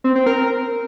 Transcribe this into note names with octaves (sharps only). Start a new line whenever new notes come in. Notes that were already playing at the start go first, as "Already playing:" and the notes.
C4
C4
A#4